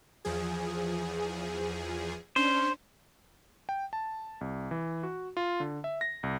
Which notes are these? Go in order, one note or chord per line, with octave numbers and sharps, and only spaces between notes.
E2 F3 G#4
C#4 D4 C5
G5
A5
C2
E3
F#4
F4
D3
E5
A#6
C2